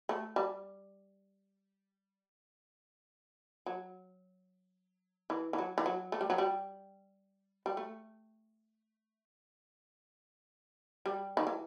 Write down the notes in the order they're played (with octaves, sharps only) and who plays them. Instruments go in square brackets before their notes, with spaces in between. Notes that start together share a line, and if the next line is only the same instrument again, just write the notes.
[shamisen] A3
G3
F#3
E3
E3
F#3
E3
F#3
A3
G3
F#3
G3
G3
A3
G3
D#3
E3